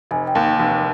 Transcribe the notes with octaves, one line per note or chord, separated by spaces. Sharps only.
F1 G#5
G5
D#2
G5
F1 G5